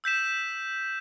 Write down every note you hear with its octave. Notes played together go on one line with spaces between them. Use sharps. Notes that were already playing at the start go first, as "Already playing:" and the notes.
E6 G6 B6 E7